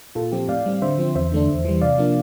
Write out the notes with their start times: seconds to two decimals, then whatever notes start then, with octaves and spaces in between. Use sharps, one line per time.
0.15 A#2 F4 A4
0.32 F3 C4 G4
0.49 A2 D5 F5
0.66 G3 C4
0.82 D3 C5 E5
0.98 F3 C4
1.15 E2 C5 E5
1.32 D3 A3 D4
1.49 E2
1.65 E3 G3
1.81 C3 D5 F5
1.98 F3 A#3 D4